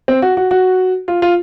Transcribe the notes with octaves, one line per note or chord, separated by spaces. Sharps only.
C4
F#4
F#4
F#4
F4
F4